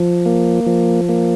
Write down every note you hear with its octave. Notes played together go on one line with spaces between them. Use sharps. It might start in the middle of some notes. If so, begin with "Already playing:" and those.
Already playing: F3
A#3
F3
A#3